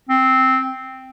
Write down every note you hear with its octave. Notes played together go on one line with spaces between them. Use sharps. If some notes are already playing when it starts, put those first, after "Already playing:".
C4